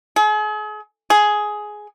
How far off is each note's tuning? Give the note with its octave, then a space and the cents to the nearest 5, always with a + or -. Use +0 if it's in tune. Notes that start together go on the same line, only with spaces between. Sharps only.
G#4 +40
G#4 +10